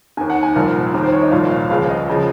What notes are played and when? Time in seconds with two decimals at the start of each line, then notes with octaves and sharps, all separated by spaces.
0.17 D#3 G#5
0.21 D#2
0.30 F#5
0.43 G#5
0.56 C2 A#2 F3 A#4
0.94 D#2 D#3 A#4
1.03 C5
1.12 C#5
1.22 D#5
1.31 C2 A#2 F3 F5
1.50 F5
1.69 C#2 C#3 F3 F5
1.89 D#5
2.09 C#3 F3